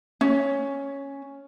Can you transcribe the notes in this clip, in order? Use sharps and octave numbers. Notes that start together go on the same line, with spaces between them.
C#4